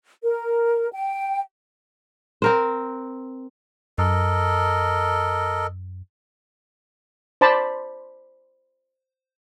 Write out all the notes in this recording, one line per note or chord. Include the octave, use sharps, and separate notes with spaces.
A#4
G5
C4 A#4 C5
F#2 A4 A#4 D#5
C5 D5 A5 B5 C6